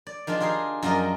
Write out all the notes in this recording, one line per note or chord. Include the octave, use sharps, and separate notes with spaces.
D5
D#3 F3 G#3 D4 F4
F4 G4 G#4 A#4 F5
F#2 F3 A#4 D5 D#5